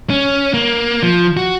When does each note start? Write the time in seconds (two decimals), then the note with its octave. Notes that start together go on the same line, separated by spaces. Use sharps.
0.10 C#4
0.54 A#3
1.03 F3
1.37 F#4